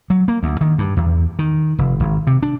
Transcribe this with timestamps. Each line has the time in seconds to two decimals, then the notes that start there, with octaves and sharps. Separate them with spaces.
0.10 F#3
0.28 A#3
0.43 D2
0.61 D#3
0.78 G2
0.97 E2
1.39 D#3
1.79 F1
2.00 G#1
2.27 C3
2.43 D4